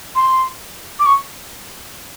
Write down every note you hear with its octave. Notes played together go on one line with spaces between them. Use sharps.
C6
D6
C#6